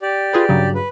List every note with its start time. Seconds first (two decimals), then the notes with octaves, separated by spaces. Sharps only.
0.02 G4 D5
0.33 F4 G#4 B4
0.49 G2 C#3 F#3
0.75 B4